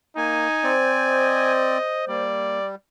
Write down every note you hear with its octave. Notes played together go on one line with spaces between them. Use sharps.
A#3 D#4 G#5
C4 C5 D5
D#5
G3 A#3 D5